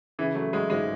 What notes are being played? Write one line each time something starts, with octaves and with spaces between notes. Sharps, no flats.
C#3 E3
F#3 A3
F#3 G#3
G#1 G#3